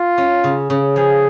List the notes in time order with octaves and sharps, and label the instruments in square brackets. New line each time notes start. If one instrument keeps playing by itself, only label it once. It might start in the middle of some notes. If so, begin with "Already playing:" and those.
Already playing: [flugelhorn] F4
[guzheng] C#4
C#3
C#3
[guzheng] F3 [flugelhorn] G#4